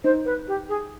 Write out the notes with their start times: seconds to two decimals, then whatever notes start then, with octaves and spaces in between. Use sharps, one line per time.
0.04 D#4 C5
0.25 B4
0.48 G4
0.69 G#4